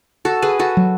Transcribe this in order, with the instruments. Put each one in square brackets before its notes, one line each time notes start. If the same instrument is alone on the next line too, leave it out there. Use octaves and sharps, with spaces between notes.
[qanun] F#4 A4
G#4 B4
F#4 A4
[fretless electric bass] F#3